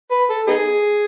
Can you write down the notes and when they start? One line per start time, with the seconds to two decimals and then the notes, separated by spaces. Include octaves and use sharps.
0.11 B4
0.30 A4
0.48 B3 D#4 G#4